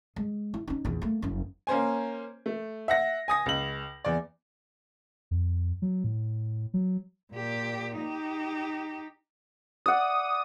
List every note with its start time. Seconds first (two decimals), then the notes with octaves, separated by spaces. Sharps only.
0.16 G#3
0.54 E4
0.68 C#4 D#4
0.85 A#1 E2
1.02 A3 A#3
1.22 F#1 F#2
1.67 A#3 C#4 C5 G#5
2.46 A3
2.88 E5 F#5 A#6
3.28 G#5 D#6 A#6
3.46 C#2 F#7
4.05 E2 D5
5.31 F2
5.82 F#3
6.04 A2
6.74 F#3
7.33 A#2 G4
7.98 D#4 G4
9.86 D5 F#5 D#6